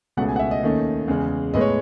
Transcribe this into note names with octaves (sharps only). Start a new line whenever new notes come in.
C#2 B2 A3 C#4 F#5
G#5
F#5
E5
D#5
D#2 D#3 A3 C#4
E2 C#3 G#3
A2 G#3 B3 D#5
C#5